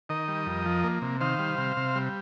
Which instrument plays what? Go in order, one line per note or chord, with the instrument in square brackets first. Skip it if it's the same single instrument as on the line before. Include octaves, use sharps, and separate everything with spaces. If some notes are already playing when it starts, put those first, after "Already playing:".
[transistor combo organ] D#3 A#4 D#5
G3
F2
F3
A#3
C3
D#3 C5 F5
G3
C3
C3
G3